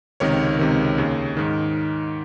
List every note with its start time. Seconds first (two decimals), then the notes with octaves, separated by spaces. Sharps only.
0.20 C#2 C3 D#3 A#4 C#5
0.59 C#2 C3 D#3
0.98 D#2 C#3
1.37 G#2 D#3